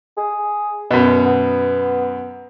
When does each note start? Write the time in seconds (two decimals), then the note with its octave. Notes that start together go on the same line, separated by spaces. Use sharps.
0.17 G#4
0.91 F#2 B2 B4
1.26 B3